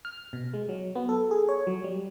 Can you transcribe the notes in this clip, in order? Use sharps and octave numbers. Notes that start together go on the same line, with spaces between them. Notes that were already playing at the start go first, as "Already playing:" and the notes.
F6
B2
G#3
F#3
B3
A4
G#4
C#5
F#3
G3